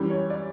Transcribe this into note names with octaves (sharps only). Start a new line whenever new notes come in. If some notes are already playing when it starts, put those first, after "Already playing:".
Already playing: F#2 E3 G3
C#5
D5